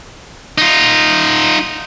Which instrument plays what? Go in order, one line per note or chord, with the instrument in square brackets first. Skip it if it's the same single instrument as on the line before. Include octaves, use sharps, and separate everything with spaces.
[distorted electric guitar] D#4 F4